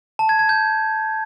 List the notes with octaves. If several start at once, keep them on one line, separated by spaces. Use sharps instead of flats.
A5
G#6
G#6
G6